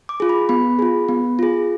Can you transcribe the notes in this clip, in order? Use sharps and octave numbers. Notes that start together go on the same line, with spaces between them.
D6
F4 G#4
B5
B3 B5
F4 G#4
B3
F4 G#4